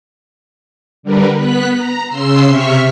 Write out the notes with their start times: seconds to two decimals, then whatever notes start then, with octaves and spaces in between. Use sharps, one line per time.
1.03 D3 G3 A#4 B4
1.37 B3 F#6 B6
1.74 A#5
2.07 C#3 C6 E6 C7
2.45 C3 E5 C#6 F6 B6